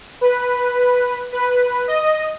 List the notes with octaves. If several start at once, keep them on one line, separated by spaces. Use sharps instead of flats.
B4
B4
D#5